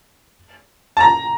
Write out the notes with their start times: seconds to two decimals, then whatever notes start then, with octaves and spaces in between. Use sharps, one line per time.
0.97 A5
1.00 A#5